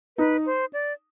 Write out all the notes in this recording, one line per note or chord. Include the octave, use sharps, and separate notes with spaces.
D#4 B4
C5
D5